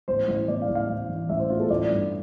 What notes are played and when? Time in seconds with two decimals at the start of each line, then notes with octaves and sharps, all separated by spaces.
0.08 A1 C5
0.28 A1
0.48 A1 D5
0.62 F5
0.69 A1
0.75 F5
0.89 A1
1.09 E3
1.29 A1 E5
1.39 C5
1.50 A2 F4
1.60 A4
1.70 A1 D5
1.90 G2